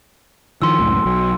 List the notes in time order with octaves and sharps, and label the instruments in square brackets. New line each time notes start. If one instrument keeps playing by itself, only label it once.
[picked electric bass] D#3 F3 [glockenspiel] C6 E6
[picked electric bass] C#2 F#2 A2
B1 F#3